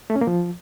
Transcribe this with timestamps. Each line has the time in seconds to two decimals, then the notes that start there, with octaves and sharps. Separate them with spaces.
0.10 A3
0.16 C#4
0.21 A#3
0.27 F3